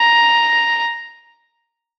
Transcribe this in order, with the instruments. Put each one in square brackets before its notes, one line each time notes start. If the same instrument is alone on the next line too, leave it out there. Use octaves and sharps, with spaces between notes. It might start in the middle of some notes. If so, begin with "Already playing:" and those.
Already playing: [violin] A#5